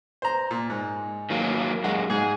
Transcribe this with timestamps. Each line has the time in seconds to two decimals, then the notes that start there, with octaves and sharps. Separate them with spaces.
0.22 C5 A#5
0.51 A#2
0.70 G#2
1.30 D#3 F#3 A#3
1.84 F#2 G#3 F#4
2.10 G#2 G#4